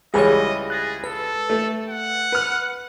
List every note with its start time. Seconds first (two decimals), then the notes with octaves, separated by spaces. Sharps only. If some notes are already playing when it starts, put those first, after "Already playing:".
0.14 C#2 E3 G3 G#4 C#5 D#5
0.70 G#4 F#6 A6 A#6
1.04 A4 B4
1.50 A3
1.89 F#5
2.32 B4 F6